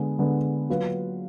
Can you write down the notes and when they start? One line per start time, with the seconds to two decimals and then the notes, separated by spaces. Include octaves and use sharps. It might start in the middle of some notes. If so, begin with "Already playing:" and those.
Already playing: D3 G#3 B3
0.19 D3 G#3 B3
0.70 F#3 A#3 F4 B4